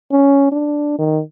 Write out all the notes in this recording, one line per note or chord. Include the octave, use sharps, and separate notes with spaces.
C#4
D4
D#3